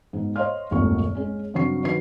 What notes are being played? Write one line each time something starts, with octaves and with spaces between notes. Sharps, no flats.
G#2 B2
C5 C#5 D#5 F5 C6 F6
D#1 G#1 F#2 A#2 A3 C#6
G#3 C#4 G#4
G2 C#3 F#3 C4 C#6 C7
D#3 F#3 F#4 B4 C7